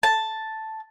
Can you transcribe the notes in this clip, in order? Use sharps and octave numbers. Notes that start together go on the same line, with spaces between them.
A5